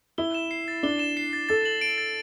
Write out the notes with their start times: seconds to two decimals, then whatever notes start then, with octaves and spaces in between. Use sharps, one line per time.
0.18 E4 G7
0.34 E7
0.51 C7
0.68 A6
0.83 D4 G7
0.99 E7
1.17 C7
1.33 A6
1.49 A4 A6
1.65 F#7
1.81 D7
1.98 A6